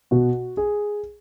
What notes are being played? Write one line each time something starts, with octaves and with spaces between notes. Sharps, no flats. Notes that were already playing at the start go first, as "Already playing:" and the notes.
B2 F#4
G#4